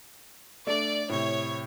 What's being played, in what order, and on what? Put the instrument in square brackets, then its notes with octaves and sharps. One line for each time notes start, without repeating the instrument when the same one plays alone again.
[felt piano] A3 D4 [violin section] D5
[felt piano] A2 C3 [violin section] C#5